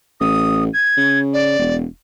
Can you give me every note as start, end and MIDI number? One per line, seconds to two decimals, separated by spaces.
0.21 0.69 33
0.21 0.64 87
0.74 1.19 92
0.97 1.57 49
1.33 1.75 74
1.59 1.84 28